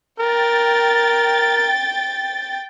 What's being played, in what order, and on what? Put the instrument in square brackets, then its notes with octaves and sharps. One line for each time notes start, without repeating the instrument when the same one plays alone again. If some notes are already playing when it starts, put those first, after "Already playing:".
[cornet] A#4 [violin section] G5 A6